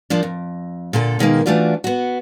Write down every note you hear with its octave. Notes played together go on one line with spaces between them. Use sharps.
F3 A#3 D4
F2
A#2 D3 A4
B2 D#3 G#3 A#3
E3 A3 D4 F4 F#4 D5
B3 F#4